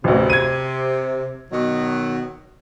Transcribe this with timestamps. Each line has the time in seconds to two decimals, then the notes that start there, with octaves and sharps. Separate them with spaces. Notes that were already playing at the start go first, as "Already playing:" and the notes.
0.04 A1 D2 C3
0.30 G#6 D#7
1.51 B2 D#3 F#3